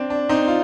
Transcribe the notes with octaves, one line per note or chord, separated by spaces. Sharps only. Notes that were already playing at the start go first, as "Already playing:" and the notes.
Already playing: C4 D4
D4
C4 D#4
F4